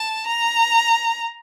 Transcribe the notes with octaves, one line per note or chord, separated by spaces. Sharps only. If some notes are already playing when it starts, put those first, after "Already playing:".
Already playing: A5
A#5